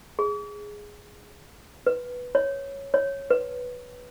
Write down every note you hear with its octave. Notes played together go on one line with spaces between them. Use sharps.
G#4
B4
C#5
C#5
B4